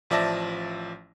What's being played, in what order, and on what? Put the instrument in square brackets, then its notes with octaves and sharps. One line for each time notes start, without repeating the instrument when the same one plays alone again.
[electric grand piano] A1 F3 D5 E5 A5 A#6